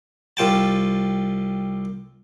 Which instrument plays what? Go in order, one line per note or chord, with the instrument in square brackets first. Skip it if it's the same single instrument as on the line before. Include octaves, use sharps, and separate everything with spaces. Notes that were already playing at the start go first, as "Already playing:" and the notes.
[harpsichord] C2 F4 G5 A5